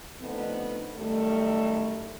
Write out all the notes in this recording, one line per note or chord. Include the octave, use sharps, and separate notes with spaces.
D3 F3 A3 B3 C4 D#4
F#2 D#3 G3 A3